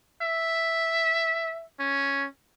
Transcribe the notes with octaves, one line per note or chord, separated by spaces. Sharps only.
E5
C#4